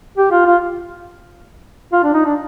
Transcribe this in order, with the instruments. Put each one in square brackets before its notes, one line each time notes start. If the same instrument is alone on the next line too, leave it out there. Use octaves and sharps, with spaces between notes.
[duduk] G4
F4
F4
F4
D4
D#4
D4